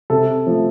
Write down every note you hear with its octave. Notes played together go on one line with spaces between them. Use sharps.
C3 A4
F3 A3